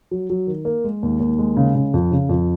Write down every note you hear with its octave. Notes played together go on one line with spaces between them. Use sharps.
F#3
F#3
D#3
A#3
G#3
D#2
D#2
G#3
C#3
C#3
F2
C#3
F2